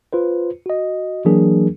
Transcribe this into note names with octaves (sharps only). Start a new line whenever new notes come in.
F4 B4 C5
F#4 D#5
E3 F#3 A#3 D4 G#4 A#4